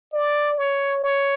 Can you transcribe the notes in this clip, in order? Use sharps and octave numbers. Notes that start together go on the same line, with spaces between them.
D5
C#5
C#5